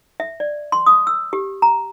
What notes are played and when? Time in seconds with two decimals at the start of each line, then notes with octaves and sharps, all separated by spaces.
0.20 E5
0.40 D5
0.72 C6
0.86 D#6
1.07 E6
1.33 G4
1.62 A#5